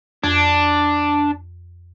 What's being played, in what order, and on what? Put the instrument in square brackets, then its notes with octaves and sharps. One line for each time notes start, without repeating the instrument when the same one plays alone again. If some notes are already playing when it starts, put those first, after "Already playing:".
[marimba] F2 [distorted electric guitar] D4